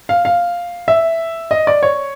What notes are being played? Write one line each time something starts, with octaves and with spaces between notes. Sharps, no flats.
F5
F5
E5
D#5
D5
C#5